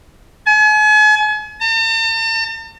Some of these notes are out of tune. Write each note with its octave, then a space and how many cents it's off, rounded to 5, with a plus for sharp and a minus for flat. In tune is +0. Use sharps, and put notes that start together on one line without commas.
G#5 +40
A5 +45